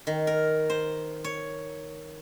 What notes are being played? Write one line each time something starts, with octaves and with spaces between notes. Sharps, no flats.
D#3
A#4
C5
C#5